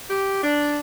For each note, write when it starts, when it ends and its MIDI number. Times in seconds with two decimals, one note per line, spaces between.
0.10 0.42 67
0.44 0.79 62